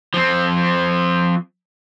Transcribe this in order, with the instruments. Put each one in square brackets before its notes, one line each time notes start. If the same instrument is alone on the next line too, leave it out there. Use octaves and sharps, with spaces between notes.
[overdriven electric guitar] F3 C4